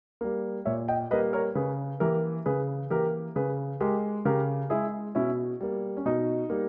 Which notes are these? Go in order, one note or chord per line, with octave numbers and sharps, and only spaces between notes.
G3 A#3
A#2 C#5 E5
D#5 G5
G3 A#3 B4 D#5
A#4 C#5
C#3 G#4 B4
E3 A#3 G4 A#4
C#3 G#4 B4
E3 A#3 G4 A#4
C#3 G#4 B4
G#3 G4 A#4
C#3 G4 A#4
G#3 E4 G#4
B2 C#4 E4
G3 A#3
C#4
B2 D#4
G3 A#3